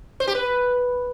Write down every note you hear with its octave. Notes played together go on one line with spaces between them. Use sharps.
C5
G4
B4